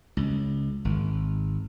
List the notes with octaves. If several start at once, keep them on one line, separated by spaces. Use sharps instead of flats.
C#2
G#1